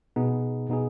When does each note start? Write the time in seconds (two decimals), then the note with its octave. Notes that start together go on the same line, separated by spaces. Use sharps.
0.16 B2 B3 D#4 G#4
0.69 B2 B3 D#4 G#4